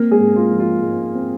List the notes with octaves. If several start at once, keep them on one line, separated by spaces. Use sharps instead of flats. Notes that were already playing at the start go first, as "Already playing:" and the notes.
Already playing: A#3 C4 A#4
G#3 G#4
G#2
F4
F3
F4
G#2
C4